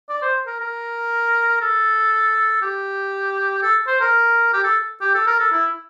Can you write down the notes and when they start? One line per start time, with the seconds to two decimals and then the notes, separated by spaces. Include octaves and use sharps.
0.09 D5
0.22 C5
0.47 A#4
0.60 A#4
1.61 A4
2.62 G4
3.63 A4
3.87 C5
4.01 A#4
4.54 G4
4.64 A4
5.01 G4
5.15 A4
5.27 A#4
5.40 A4
5.52 E4